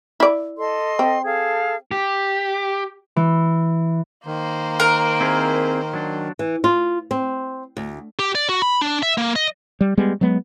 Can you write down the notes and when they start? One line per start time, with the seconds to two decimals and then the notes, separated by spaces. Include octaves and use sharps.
0.20 E4 D5
0.57 A4 D#5 C6
0.99 C4
1.25 G#4 A4 F5
1.91 G4
3.16 E3
4.26 D#3 A#3 C5
4.80 A#4
5.21 C4 E4 G#4
5.94 F#3 D4
6.39 E3
6.64 F4
7.11 C4
7.77 D2
8.19 G4
8.35 D5
8.49 F#4
8.62 B5
8.81 D4
9.03 E5
9.18 A#3
9.36 D#5
9.81 G3
9.97 G3 G#3 B3
10.21 F#3 G#3 B3